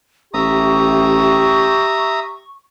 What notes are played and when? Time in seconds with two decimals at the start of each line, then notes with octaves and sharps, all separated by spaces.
0.34 A1 G4 E5 A#5 C#6 D#6